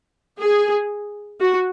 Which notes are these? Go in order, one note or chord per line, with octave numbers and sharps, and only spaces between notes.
G#4
F#4